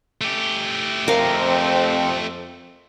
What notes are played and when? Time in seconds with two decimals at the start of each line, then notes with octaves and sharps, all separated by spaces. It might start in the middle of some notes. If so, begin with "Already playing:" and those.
0.21 A3 G4
1.08 F2 C4 A#4 F5